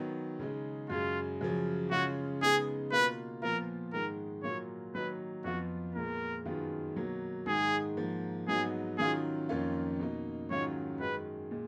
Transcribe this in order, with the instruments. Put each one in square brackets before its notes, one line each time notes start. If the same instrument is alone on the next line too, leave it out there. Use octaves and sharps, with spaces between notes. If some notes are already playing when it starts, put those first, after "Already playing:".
Already playing: [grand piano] D#3 F#3 B3
C#3 G#3 D#4
[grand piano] F#2 C#3 G#3 [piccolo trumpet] F4
[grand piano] F#2 C#3 F3
[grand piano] C#3 G#3 C#4 F4 [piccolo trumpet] F#4
[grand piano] C#3 G#3 B3 D#4 [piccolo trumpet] G#4
[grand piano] B2 A#3 F4 [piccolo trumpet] B4
[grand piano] A#2 F3 B3 F4 [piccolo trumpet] A#4
[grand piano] G#2 D#3 G#3 [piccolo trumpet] A#4
[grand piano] A#2 F#3 A#3 F4 [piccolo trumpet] C#5
[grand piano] D#3 F#3 A#3 D#4 [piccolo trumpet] B4
[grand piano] F2 F3 B3 F4 [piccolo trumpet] F#4
[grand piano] A#2 G#3 B3 [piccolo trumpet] A#4
[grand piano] F#2 D#3 G#3 B3 F4
B2 F#3 A#3
[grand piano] G#2 D#3 G#3 [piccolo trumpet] G#4
[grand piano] G#2 F3 A#3
[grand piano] G#2 F#3 B3 D#4 [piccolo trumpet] G#4
[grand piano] D#3 F#3 C#4 F4 [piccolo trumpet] G#4
[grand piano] F2 D#3 A#3 C#4 F4
B2 A#3 D#4
[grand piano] G#2 D#3 F#3 C#4 F4 [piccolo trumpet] C#5
[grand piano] F#2 D#3 G#3 [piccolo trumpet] B4
[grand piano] A#2 G#3